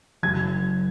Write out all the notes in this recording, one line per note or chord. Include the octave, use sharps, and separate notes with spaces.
F#1 F#2 F#3 G#6